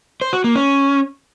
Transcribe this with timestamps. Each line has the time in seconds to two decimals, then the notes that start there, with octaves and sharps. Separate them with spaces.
0.21 C5
0.33 F#4
0.44 A#3
0.56 C#4